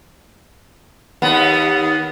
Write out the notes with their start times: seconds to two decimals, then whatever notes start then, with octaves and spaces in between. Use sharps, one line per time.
1.22 D#2 B3